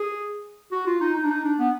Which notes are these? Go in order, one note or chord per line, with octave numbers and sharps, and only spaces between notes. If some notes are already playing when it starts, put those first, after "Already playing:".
Already playing: G#4
F#4
F4
D#4
D#4
D4
D#4
D4
B3